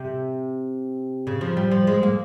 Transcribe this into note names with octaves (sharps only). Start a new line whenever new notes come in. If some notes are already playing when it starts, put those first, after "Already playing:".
Already playing: C3
C#3
F3
G3
F3
G#3
A#3